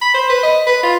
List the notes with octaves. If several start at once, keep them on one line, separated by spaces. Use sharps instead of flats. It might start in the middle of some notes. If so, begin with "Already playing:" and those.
B5
C5
B4
D#5
B4
F4